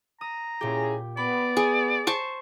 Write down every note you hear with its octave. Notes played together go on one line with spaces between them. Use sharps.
A#5 D#6
A#2 C#4 E4 G4 G#4
B3 D5 B5
G#4 D#6
C5 A5 C#6